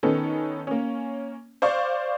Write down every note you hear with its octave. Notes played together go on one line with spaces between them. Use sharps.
D#3 B3 C#4 D#4 A4
A#3 C#4
C5 D5 F5 C#6